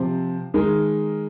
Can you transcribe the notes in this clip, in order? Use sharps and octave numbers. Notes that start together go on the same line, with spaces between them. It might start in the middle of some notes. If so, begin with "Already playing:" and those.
Already playing: C3 F3 C4
D#3 G#3 D#4 A#4